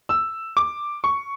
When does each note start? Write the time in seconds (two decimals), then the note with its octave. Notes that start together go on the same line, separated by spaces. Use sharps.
0.09 E6
0.57 D6
1.04 C#6